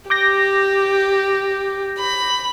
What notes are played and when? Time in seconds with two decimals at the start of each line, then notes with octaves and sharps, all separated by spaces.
0.10 G4 D6 G6 A#6
1.99 B5